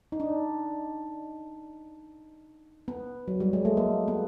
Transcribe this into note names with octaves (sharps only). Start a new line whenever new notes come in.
D#4
D4
B3
F#3
G3
G#3
A3
A#3
B3